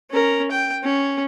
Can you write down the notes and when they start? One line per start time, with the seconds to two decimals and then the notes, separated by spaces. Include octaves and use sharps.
0.10 C#4 A#4
0.51 G5
0.83 C#4